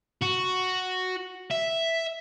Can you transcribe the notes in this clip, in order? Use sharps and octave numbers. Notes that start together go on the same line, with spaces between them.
F#4
E5